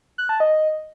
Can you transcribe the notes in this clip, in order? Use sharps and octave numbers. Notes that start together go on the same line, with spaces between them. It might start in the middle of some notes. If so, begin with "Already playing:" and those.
F#6
A5
D#5